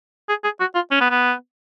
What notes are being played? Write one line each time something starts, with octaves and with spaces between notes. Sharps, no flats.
G#4
G#4
F#4
F4
C#4
B3
B3